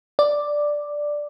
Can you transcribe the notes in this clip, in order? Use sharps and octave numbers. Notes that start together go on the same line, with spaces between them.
D5